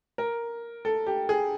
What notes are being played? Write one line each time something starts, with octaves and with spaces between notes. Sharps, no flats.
A#4
A4
G4
G#4